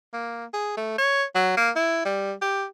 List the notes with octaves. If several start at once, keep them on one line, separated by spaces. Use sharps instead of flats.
A#3
G#4
A3
C#5
F#3
A#3
E4
G3
G4